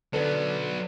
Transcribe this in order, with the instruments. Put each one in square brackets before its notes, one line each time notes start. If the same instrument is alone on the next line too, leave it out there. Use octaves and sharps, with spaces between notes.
[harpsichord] D3 [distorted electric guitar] F#3 B3 [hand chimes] B4 D5